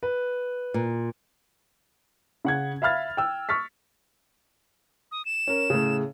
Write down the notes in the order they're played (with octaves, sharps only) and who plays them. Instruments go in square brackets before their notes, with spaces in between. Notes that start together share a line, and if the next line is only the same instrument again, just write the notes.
[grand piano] B4
[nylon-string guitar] A#2
[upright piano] C#3 F#5 G#6
E5 F5 B5 F6 A6
G5 E6
C#6 F6 A6 B6
[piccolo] D#6
E7
[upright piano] C#4 A#4
A2 C#3